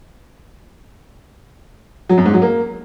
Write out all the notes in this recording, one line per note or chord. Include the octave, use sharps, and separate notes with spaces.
F#3
F#2
G#2
F#3
A#3